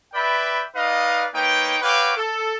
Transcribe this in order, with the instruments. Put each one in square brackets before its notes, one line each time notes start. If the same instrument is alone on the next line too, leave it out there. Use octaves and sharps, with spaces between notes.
[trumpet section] B4 D5 E5 G5 B5
D#4 B4 D5 D#5 F5
A#3 D#4 B4 C#5 G5
F#4 B4 C#5 F5 G5 D6
A4